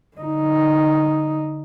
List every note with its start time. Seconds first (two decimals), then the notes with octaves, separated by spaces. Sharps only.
0.17 D3 D#4